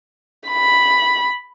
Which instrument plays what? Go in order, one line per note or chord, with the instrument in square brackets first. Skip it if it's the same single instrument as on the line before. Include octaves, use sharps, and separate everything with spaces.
[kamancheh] B5